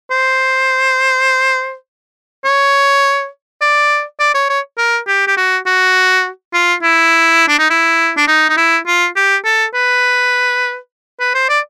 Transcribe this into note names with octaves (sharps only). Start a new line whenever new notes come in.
C5
C#5
D5
D5
C#5
C#5
A#4
G4
G4
F#4
F#4
F4
E4
D4
D#4
E4
D4
D#4
D#4
E4
F4
G4
A4
B4
B4
C5
D5